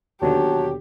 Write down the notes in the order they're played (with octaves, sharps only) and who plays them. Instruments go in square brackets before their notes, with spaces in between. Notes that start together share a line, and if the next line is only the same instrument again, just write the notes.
[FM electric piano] D#2 B2 D3 [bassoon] F#3 [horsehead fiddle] G4 [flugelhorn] A5